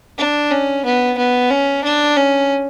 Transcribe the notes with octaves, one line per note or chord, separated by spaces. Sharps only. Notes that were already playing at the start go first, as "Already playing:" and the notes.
D4
C#4
B3
B3
C#4
D4
C#4